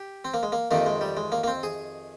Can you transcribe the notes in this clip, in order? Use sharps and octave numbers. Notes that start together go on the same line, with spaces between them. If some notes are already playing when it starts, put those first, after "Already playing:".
Already playing: G4
C4
A#3
G#3
A#3
F2 C3 D#3 A#3
G#3
G3
G#3
A#3
A#3
C4
G#4